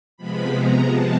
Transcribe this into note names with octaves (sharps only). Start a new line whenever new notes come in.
C3 F3 G#3 B3 B5
A#5
A5